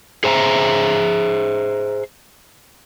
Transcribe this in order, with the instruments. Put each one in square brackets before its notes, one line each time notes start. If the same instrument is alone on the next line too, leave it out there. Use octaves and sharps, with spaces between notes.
[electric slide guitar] G#4 C5 E5 G#5 A#5